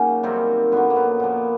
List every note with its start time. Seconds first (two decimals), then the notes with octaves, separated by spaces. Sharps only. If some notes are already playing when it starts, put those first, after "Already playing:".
Already playing: C#3 F#3 A#3 C#4 D#4
0.23 F#2 C3 D#3 G3 C4
0.72 F#2 D3 F#3 B3
0.90 A#3
0.96 B3
1.20 A#2 F3 A#3